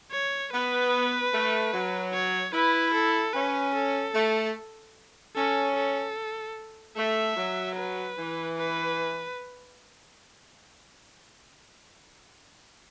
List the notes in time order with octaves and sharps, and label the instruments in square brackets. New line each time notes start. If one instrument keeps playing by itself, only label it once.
[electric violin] C#5
[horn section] B3 [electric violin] B4
[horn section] A3
F#3
[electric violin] C#5
[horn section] E4 [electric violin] B4
[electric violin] A4
[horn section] C#4 [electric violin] B4
[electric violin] A4
[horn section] A3
[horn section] C#4 [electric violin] A4
[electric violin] A4
[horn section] A3 [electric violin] E5
[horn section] F#3
[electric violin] B4
[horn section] E3
[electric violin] B4